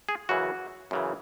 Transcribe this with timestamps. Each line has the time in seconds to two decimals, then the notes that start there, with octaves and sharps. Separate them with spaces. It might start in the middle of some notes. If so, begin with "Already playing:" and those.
0.09 G#4
0.29 F#2 C#3 E3 F#4
0.91 F#2 C#3 E3